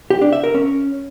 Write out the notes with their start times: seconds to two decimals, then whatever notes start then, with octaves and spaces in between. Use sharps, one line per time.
0.10 G4
0.21 D4
0.33 E5
0.44 A#4
0.55 C#4